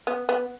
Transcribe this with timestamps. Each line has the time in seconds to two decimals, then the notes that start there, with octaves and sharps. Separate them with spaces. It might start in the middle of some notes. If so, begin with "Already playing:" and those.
0.07 B3
0.29 B3